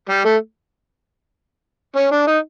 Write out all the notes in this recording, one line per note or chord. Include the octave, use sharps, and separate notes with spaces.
G3
A3
C#4
D4
D#4